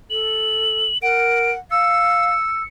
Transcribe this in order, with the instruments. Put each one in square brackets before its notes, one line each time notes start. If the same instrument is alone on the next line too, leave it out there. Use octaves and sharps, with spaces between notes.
[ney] A4 [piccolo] F#7
[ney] A#4 [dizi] F#5 [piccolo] D7
[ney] F5 [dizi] E6 [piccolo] C#7